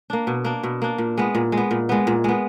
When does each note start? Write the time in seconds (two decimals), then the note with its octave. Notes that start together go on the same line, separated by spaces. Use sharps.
0.10 A#3 D4
0.27 B2
0.45 A#3 D4
0.63 B2
0.82 A#3 D4
0.98 A#2
1.18 G#3 B3
1.35 A#2
1.52 G#3
1.57 B3
1.71 A#2
1.89 G#3 B3
2.07 A#2
2.24 G#3 B3